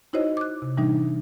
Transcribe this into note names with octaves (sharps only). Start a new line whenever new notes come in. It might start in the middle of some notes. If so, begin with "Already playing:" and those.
D#4 E4 F#4 C5 C#5 D#5
D6 F#6
C3
A2 E3 G3 D4 D#4